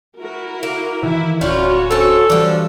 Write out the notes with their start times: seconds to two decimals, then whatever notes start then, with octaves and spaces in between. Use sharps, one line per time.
0.20 E4 F#4 A#4
0.63 A#3
1.03 D#3 E3 E4 E5
1.41 D1 G3 C#4 F4 F#4 C#5
1.91 C4 C#4 A4
2.30 E3 F3 G3 D4